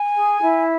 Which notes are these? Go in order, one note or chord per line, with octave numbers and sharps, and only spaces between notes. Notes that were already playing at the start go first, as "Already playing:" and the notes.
Already playing: G#5
G#4
E4